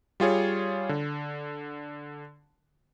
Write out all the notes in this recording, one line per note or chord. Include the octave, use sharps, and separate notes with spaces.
G3 F4 G#4 C#5
D3